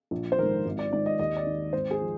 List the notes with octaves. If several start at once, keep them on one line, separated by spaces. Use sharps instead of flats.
A#1
C5
G#2 D#3 A#4
G#1
D5
G#2 D#3 D5
D#5
D#2 D#5
D5
D#3
G#1 C5
G#4
F3